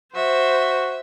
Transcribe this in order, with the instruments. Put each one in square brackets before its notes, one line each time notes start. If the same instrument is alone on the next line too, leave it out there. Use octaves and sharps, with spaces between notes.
[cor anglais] F#4 [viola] C5 [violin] E5